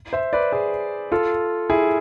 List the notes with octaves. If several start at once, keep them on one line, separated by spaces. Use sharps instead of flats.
C5 E5
B4 D5
G#4 B4
F4 A4
E4 G#4